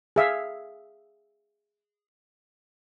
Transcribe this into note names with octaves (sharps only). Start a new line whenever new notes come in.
G#4 E5 F5